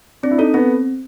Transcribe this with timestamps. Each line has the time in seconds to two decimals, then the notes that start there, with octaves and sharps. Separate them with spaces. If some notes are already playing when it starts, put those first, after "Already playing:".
0.23 C4 D4
0.31 E4
0.38 D#4 A4
0.54 B3 C4